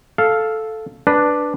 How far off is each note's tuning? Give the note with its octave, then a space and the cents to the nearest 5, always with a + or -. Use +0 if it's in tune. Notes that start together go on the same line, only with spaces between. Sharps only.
A4 -5 F5 +0
D4 +0 B4 +0